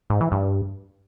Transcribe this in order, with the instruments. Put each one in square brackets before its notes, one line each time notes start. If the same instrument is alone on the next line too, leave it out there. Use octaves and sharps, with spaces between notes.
[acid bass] G#2
E3
G2